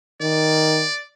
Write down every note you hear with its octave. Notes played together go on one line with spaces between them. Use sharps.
D#3 D5